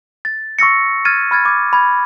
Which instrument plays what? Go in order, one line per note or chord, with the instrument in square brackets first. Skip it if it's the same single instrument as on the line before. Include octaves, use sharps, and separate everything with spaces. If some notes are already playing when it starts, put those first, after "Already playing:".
[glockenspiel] A6
C#6 E6 A#6 C#7
F6 G#6 A6 D#7
B5 F6 G#6 A6
D6 G#6
B5 G#6